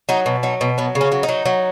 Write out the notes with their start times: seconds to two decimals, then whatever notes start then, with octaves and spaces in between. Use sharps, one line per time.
0.09 F#3 D#4
0.26 B2
0.43 F#3 D#4
0.61 B2
0.78 F#3 B3
0.95 C#3
1.01 C#4
1.12 F#3
1.23 D#4
1.29 F#3
1.46 F#3